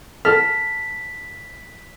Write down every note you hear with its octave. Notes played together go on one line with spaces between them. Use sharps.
A4 F6 B6